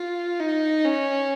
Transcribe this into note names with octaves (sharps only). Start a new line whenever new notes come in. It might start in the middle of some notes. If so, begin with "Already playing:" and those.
Already playing: F4
D#4
C#4